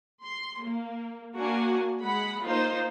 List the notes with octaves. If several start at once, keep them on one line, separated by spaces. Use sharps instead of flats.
C6
A#3
A#3 D4 F#4 G#5
G#3 F#5 B5
A#3 D#4 F4 C5